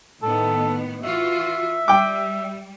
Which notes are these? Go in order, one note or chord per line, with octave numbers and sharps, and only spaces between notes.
A2 D#3 B3 A4
E3 F4 F#4 E5
G3 G5 D6